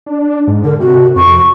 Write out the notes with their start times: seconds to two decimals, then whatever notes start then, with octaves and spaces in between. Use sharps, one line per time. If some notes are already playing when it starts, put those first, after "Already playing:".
0.06 D4
0.47 G#2
0.65 D3 A#4
0.80 C3 F#4
1.16 F2 C#6